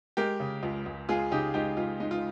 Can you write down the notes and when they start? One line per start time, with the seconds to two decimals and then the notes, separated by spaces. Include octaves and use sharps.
0.17 G#3 G4 A#4
0.40 C#3
0.63 C#2
0.86 C#2
1.09 G#3 F4 G#4
1.31 C#3 D#4 G4
1.54 C#2 D#4 G4
1.77 C#2 F4
2.00 G#3 D#4
2.11 F4